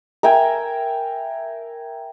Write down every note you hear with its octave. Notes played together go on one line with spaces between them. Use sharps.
A#4 E5 G5 G#5